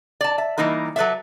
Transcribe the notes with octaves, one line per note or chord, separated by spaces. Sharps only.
D5 A5
E5
E3 G3 A#3 D#4 A#4
F#3 A4 B4 C5 D5 E5